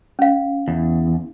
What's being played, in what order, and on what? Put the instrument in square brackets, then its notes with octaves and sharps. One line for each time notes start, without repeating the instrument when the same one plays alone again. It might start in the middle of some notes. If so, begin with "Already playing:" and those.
[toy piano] C#4 F5
[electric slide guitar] E2